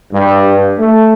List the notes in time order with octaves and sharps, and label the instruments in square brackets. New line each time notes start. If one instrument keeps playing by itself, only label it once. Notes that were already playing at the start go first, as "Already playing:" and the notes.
[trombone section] G2
A3